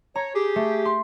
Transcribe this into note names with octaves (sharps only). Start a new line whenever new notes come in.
C#5 A#5
G4 G#4
A3
C6